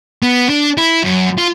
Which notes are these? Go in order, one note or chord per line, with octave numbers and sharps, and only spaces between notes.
B3
D4
E4
F#2
F4